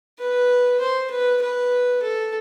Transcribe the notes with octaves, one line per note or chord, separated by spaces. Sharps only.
B4
C5
B4
B4
A4